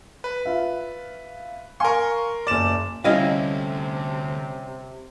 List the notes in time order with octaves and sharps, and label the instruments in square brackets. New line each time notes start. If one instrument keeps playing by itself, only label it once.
[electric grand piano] B4
[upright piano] F4 E5
[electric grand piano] A#4 C6 [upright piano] F5 G#5 C#6
[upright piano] F#1 D6 [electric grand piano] D5 E7
[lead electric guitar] D2 [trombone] C3 [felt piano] G3 C#4 [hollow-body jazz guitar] E4 D#5 F5